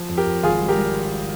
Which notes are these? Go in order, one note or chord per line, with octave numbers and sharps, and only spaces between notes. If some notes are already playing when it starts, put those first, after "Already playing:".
Already playing: F3
F2
G4 A#4
F2
G#1 F4 G#4
G3
G4 A#4
G3